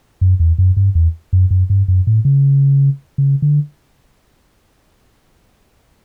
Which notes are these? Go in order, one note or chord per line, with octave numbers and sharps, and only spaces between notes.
F#2
E2
F#2
G2
E2
F#2
F#2
G2
F#2
A2
C#3
C#3
D3